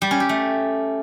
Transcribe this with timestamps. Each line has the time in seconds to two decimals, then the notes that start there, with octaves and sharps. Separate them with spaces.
0.02 G3
0.11 C#4
0.20 G4
0.29 A3